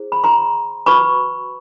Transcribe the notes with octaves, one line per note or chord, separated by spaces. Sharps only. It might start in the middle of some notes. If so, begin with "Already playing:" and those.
Already playing: E4 G#4 C5
B5
A#5 C6
F#4 B4 B5 C#6